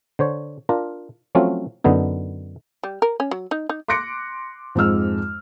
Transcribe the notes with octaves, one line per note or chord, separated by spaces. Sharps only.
D3 C5 C#5
D4 F4 A#4
F3 F#3 A3 C4 C#4 F4
F#2 D3 B3 D#4
G3
A#4
C#4
F#3
D#4
D#4
C6 D6 F#6 A#6 C#7 D7
F2 G#2 G#3 E6 F6